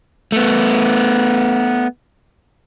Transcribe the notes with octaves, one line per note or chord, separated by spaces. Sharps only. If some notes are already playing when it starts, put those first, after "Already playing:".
A3 B3